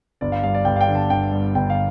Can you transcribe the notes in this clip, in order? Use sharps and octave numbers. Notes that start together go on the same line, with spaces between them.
G1 D5
F5
G2 F5
D5
G1 G5
F5
G5
D3
A5
G1 G5
G2
G1 G5
F5